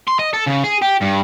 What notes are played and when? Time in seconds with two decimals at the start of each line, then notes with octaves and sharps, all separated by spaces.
0.08 C6
0.19 D#5
0.33 A4
0.46 C#3
0.64 G#4
0.82 G4
1.02 G2